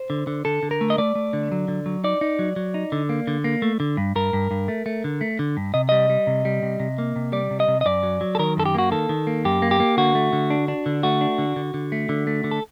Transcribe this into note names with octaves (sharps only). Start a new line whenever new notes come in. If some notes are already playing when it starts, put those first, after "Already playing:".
Already playing: C5
D3
D3
D3 A4
D3
A#4
A3
D#5
A3 D5
A3
D3
F#3
D3
F#3
D#4 D5
D#4
F#3
F#3
D#4
D3
A#3
D3
A#3
A3
D3
G2
G2 A#4
G2
G2
A3
A3
D3
A3
D3
G2
C3 D#5
G3 D#5
G3
C3
G3
C3
C3
A#3
C3
G3 D5
C3
D#5
C3
D#5
F#2 D5
F#3
F#3
A4
D#3 A#4
F#2 A4
G4
A#3 F#4
D#3 A4
D#3
A#3
F#2 G4
A#3
G4
A#3
D3 F#4
A3
D3
D4
D4
D3
A3 F#4
D4
D3
D3
D3
A3
D3
A3
D3
A4